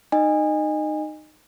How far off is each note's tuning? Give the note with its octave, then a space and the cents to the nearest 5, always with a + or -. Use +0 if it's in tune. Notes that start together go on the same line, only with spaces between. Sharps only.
D#4 -20 D#5 -20 G#5 -25